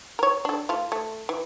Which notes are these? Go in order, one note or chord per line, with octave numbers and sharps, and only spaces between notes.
A#4 C#5
D4 A4
A3 F4
A3
E3